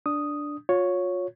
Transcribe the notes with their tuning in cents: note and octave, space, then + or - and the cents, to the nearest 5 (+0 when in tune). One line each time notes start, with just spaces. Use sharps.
D4 +0 D#6 +0
F4 +35 C#5 +0